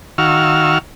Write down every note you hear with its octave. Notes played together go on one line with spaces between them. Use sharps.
D#3 F#4 F5 C#6 E6 F6